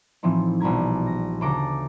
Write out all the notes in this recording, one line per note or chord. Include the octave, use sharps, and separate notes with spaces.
A2 E3 F3 C4 D#4
A#1 B2 G3 A#5 G#6
A#6
D2 C#3 A4 A#5 D6 A#6